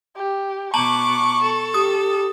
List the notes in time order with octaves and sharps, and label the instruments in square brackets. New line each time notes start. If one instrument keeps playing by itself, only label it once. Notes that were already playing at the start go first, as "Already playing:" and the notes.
[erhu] G4
[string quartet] B2 D6 [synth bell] A5 A#5 F#7 [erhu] C#6
[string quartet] A4
[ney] G4 [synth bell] D#6